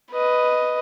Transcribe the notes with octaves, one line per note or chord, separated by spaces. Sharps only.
B4 D#5